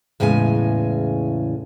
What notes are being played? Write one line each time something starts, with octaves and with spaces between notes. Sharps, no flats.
E2 A2 C#3 G#3 G#5